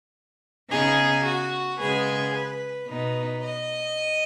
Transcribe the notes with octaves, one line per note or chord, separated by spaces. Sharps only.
C#3 B3 D#4 G#4
F#4
C#3 G#3 B3 G#4
B4
B2 B3 D#4 B4
D#5